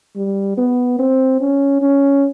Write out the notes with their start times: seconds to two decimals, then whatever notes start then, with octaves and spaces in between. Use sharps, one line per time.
0.16 G3
0.58 B3
0.99 C4
1.41 C#4
1.82 C#4